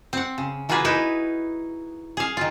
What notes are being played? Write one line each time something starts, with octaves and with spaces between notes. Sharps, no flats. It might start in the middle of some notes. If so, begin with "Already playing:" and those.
C4 F#5
C#3
E3 A#3 F4 F#4 G#4 B4
D#4 E4 B4
G#4 F5
D#3 F4